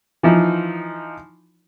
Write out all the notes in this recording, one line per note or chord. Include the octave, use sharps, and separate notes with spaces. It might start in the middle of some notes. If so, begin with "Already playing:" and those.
E3 F3 D#4 F4